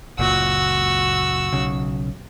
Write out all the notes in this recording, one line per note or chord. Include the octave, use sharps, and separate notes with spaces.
F#1 C#2 A#2 F#4 E6
B1 C#3